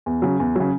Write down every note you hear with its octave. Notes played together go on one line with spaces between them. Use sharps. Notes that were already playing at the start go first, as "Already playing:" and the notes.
E2
C#3 F#3
E2
C#3 F#3